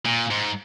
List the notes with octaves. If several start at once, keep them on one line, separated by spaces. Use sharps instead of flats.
A#2
G#2